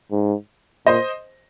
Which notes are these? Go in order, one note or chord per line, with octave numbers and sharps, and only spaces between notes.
G#2
A#2 C5 D#5